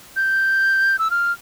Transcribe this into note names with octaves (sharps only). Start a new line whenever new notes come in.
G6
E6
F6